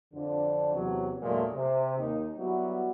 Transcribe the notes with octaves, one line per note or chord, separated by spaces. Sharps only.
F2 D3 D4
E2 C3 F#3
E2 G2 A#2 F#3 G#3 A3
C3
D#2 D#4
F#3 G3 B3 E4 F#4